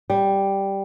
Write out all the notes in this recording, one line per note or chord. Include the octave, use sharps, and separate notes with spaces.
G3